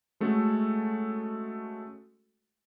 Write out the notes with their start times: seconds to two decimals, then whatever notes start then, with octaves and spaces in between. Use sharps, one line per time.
0.20 G#3 A3 C#4 F#4 A4